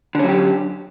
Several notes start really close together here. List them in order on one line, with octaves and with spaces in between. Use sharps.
D3 C#4 F#3 G4